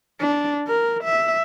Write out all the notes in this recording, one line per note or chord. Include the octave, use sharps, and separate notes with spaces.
D4
A#4
E5